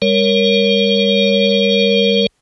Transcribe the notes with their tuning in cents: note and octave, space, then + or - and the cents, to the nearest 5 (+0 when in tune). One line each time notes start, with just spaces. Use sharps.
G3 +40 A#4 +0 C#5 +0